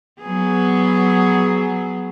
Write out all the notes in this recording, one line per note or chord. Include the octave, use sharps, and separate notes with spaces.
F#3 B3 G#4